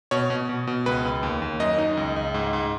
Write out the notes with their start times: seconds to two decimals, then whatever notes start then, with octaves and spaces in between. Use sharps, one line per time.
0.11 B2 C#5
0.30 B2
0.49 B2
0.67 B2
0.86 C#2 B4
1.05 C#2
1.23 D#2
1.42 D#2
1.60 F#2 D#5
1.78 D#4
1.97 C#2
2.16 C#2
2.34 G#2
2.53 G#2